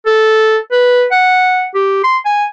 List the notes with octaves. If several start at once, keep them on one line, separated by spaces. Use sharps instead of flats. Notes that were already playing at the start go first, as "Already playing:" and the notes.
A4
B4
F#5
G4
C6
G#5